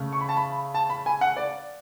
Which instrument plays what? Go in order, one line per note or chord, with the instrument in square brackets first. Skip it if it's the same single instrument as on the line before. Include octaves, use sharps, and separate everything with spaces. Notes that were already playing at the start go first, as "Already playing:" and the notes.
Already playing: [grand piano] C#3 A3
C#6
B5
A5
B5
A5
B5
G#5
F#5
D5